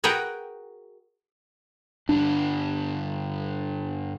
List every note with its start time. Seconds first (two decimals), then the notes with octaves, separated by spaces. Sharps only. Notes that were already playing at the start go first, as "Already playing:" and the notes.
0.04 F#4 G#4 A#4 B4 F#5 G5
2.09 G2 D3 D4